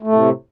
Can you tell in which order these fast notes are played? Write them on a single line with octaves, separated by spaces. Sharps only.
A3 A2 C3